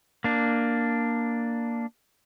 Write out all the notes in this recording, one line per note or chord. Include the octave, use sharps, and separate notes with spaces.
A#3 D4